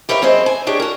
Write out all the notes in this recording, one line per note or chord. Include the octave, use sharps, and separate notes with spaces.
G4 A#4 B4 C#5 E5 F5
F#2 C4 G#4 C5 D#5
G#5
D4 G4 G#4 C#5
F#4 A#4